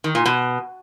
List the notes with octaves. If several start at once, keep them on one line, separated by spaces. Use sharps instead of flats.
D#3
A#2
B2